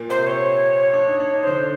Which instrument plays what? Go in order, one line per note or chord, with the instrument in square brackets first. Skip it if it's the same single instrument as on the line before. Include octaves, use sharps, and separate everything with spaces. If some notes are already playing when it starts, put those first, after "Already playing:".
Already playing: [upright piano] A#2 A#3
[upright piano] C3 C4 [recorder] C5
[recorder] C#5
[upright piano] D4
D#4
D4
D#4
[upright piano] D3 D4 [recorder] C5